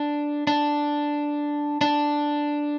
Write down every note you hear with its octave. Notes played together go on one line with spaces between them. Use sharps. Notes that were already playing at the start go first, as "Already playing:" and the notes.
Already playing: D4
D4
D4